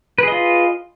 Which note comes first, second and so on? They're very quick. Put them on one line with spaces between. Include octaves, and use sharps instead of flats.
B4 G#4 D#5 F4